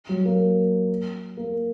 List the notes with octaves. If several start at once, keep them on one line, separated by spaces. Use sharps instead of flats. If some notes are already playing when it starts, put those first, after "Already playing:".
F#3
A#3
A#3